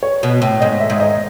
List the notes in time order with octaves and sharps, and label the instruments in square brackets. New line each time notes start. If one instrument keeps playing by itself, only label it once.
[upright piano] C#5
[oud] B2
A2
[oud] G#2 [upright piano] D#5
[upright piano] E5
[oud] G#2
[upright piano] D#5